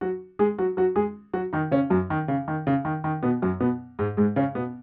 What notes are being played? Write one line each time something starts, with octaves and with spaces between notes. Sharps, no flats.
F#3 F#4
G#3 G#4
F#3 F#4
F#3 F#4
G#3 G#4
F#3 F#4
D#3 D#4
C#3 C#4
F#2 F#3
D#3
C#3
D#3
C#3
D#3
D#3
B2 B3
F#2 F#3
B2 B3
G#2 G#3
G#2 G#3
C#3 C#4
B2 B3